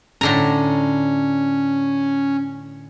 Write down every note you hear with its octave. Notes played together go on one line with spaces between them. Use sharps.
A2 D3 C#4 A#5